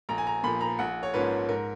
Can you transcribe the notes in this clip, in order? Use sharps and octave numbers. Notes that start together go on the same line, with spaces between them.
A#1 A#5
G#5
A#5
A#2 F3 B5
A#5
A#1 F#5
C#5
G#2 F3 A#3 C#4 B4
G#2 A#4